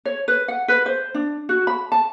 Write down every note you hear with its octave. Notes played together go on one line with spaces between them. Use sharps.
C#5
B4
F#5
B4
C5
D4
F#4
B5
A5